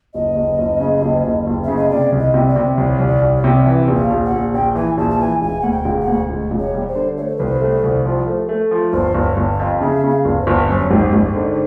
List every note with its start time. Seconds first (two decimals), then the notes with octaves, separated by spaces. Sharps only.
0.14 F#1 D#5
0.36 F#1
0.59 F#1
0.80 C#3
1.02 F#1
1.24 F#1
1.47 F#1
1.64 C#3 E5
1.76 D#5
1.90 C3 D5
2.12 C2
2.19 D#5
2.34 C3
2.48 D5
2.56 C3
2.78 C2 C#5
3.00 C2
3.08 D5
3.21 C2
3.36 C#5
3.44 C3
3.66 E3 B4
3.88 A#1
3.95 F5
4.10 A#1
4.25 F#5
4.32 A#1
4.54 A#1 G5
4.75 E3 G#5
4.98 A#1 A5
5.10 A5
5.19 E3 G#5
5.42 E1 G#5
5.61 D2 F#5
5.71 G5
5.85 E1
6.00 F#5
6.08 D2
6.29 E1
6.51 E1
6.59 C#5
6.74 G3
6.88 C5
6.96 D3
7.17 A3 C#5
7.27 C5
7.37 C2 B4
7.46 C5
7.61 A3
7.83 C2
8.05 F3
8.27 A3
8.49 A3
8.71 F3
8.93 G1 C5
9.15 G1
9.23 C#5
9.37 G1
9.51 F5
9.59 F2
9.81 C#3 E5
10.04 C#3
10.10 F5
10.25 G1
10.40 C5
10.47 G1
10.69 F#2 C5
10.79 C#5
10.90 G#1 C5
11.13 G#1
11.34 D3